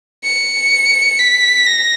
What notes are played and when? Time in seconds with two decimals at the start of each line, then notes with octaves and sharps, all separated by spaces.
0.24 C#7
1.19 B6
1.66 A#6